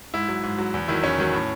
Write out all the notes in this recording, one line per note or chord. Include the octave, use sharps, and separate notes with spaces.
G#2 E4
F#3
G#2
F#3
E2
D#3 F#3 E4
E2 C#4
D#3 F#3
A2